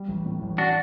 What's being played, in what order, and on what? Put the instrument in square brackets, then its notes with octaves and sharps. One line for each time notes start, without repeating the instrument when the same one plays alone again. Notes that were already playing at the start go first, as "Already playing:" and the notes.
Already playing: [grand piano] G3
A1
A2
A1
[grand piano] C#4 [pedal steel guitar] D4 F#4